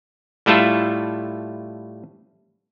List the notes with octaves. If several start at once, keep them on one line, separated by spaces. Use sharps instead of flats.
A2 G3 A3 E4 F4 A4